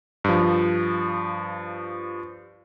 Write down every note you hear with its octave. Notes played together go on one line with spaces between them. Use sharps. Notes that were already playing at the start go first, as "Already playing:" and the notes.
G2 F3